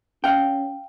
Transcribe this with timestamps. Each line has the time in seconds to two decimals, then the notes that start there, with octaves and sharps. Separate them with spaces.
0.24 C#4 F5 G5